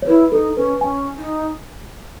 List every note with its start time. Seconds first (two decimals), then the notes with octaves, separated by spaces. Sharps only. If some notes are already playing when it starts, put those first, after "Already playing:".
0.02 C#5
0.07 E4 B4
0.32 D#4 A4
0.57 C#4 B4
0.81 C#4 G#5
1.18 D#4